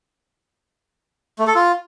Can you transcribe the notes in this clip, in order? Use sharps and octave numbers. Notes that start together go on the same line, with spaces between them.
A3
A4
F4